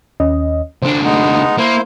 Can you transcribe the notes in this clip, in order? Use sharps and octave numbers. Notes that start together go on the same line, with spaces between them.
D#2 C#4 D#5
C#2 D4 C5
G#3 A3 B3 D#4
A#3 E4 C5